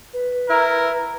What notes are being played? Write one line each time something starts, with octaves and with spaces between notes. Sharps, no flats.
B4
E4 A#4